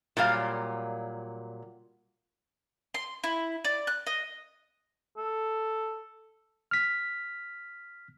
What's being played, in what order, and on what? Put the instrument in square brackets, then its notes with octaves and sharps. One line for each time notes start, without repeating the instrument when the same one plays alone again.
[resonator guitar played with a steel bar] A#2 F#3 G3 F5
[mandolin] C6
E4
D5
F#6
D#5
[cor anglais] A4
[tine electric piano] F6 B6